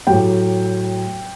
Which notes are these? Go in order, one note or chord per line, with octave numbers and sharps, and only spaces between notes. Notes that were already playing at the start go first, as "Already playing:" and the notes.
A2 F#3 G4 G5